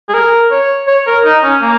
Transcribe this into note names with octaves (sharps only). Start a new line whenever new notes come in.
G#4
A#4
C#5
C#5
A#4
D#4
C#4
A#3